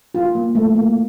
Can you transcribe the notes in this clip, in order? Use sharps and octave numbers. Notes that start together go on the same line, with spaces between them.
F4
A#3
A3
A#3